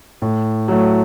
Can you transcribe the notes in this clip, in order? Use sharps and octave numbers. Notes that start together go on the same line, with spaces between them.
A2
F#3 A3